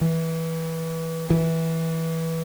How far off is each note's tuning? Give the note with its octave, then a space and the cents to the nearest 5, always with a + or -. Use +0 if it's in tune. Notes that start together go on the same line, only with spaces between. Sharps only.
E3 -15
E3 -15